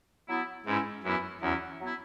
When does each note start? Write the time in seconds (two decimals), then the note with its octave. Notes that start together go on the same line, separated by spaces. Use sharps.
0.28 F#3 B3 E4
0.66 G#2 E3 C#4 E4
1.04 F#2 E3 B3 E4
1.41 E2 F#3 C#4 E4
1.79 F#3 B3 E4